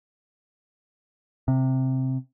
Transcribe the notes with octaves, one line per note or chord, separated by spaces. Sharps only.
C3